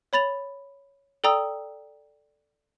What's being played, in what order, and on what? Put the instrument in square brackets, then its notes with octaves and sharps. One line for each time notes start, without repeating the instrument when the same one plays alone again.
[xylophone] C#5 B5 A6 F7
A4 D5 G5 A#5 D#6 E6